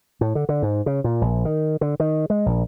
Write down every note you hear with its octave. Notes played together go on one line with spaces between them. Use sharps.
A2
D3
D3
G#2
C#3
A#2
A#1
D#3
D3
D#3
G#3
A#1